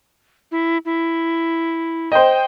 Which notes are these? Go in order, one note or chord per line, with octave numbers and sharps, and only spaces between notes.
E4
E4
C5 D#5 G5